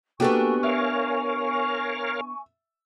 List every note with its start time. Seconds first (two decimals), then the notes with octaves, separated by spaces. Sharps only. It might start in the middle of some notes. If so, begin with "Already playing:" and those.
0.20 A#3 B3 D4 F#4 G4 A4 G#5 C#6
0.63 A#4 C#5 E5 F5